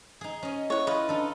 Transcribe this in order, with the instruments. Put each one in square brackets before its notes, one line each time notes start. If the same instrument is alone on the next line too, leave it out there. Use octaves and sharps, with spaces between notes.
[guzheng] D#4 G#4
C#4 D#5
[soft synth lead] E4 [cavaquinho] C#5 F#5
[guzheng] F4 [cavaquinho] B4 D#5
[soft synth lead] D4 [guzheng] D#4 A4